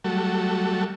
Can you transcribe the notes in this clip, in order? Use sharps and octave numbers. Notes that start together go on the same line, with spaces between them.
F#3 G3 A3 F#4 A4